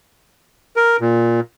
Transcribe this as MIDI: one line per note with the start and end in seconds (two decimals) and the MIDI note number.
0.76 0.96 70
1.01 1.40 46